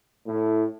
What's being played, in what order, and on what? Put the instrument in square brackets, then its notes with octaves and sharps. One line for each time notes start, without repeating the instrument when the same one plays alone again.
[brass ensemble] A2